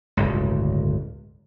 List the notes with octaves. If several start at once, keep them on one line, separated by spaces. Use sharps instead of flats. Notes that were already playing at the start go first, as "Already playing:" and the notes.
D1 G1 C#2